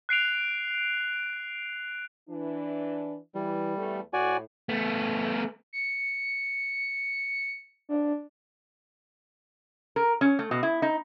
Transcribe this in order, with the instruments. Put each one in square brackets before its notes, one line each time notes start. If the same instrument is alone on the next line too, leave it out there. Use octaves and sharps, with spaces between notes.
[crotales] F#6 C7 D7 F7
[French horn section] E3 D4
[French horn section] E3 [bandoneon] G3
[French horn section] E2 A3
[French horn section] A2 [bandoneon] F#4 D5 G#5
[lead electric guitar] A3 B3
[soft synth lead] C#7
D4
[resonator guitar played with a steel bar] A#4
C#4
A3
B2
E4
D#4